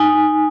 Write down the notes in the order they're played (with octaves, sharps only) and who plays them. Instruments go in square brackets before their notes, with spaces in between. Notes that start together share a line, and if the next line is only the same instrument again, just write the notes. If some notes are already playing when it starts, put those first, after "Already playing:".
Already playing: [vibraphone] D#4 G#5